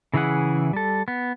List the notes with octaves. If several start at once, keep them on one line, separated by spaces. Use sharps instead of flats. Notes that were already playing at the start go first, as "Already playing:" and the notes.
C#3 E3 E4 G#4 F#5
G3 A4
B3